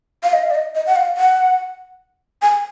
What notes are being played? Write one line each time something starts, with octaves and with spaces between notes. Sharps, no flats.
F5
D#5
F5
D5
D#5
D#5
F#5
F5
F#5
G#5